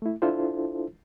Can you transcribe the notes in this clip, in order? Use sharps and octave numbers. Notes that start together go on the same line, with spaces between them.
A3 E4
D4 E4 F4 A4 C5